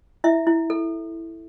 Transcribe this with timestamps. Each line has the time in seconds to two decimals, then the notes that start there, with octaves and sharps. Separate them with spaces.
0.24 E4 E5
0.47 E4
0.70 A4